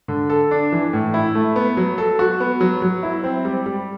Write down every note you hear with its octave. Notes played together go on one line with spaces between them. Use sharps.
D3
A4
D4
E3
A2
E4
A3
B3
F#3
A4
F#4
B3
F#3
F#3
E4
C4
G3
G3